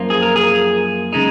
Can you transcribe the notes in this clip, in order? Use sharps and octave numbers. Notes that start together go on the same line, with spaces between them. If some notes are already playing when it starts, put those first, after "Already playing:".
Already playing: F#2 F3 A#3 F4
G#4
A#4
G#4
C#3 G#3 D#4